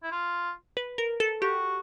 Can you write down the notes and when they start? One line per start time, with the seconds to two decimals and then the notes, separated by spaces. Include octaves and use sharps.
0.03 E4
0.12 F4
0.77 B4
0.98 A#4
1.20 A4
1.42 F#4 G4